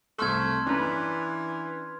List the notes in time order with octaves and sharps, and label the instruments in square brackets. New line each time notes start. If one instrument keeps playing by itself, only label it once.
[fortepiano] C2 C#6 [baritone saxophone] A3 [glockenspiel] C6 F6 G#6
[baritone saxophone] E3 [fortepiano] C#4 A#5 F#6 [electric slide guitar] D4 B4